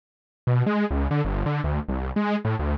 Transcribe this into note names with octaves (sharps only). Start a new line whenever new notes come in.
B2
G#3
C#2
D3
G1
D3
D2
C2
G#3
A2
D2